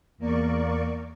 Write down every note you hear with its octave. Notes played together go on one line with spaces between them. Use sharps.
E2 A#3 A#4 D5 C#6